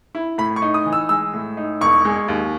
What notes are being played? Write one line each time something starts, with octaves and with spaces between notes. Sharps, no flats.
E4
A2 B5
C#6
D#4
D#6
E3
E6
G#3 E6
A2
D#4
E1 C#6
G#3
D#2